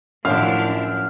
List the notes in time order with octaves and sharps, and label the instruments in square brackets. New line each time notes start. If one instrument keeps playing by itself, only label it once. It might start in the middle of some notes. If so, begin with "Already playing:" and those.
[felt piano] C#2 A2 D#3 [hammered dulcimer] F#2 [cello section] F3 D4 E4 [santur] F5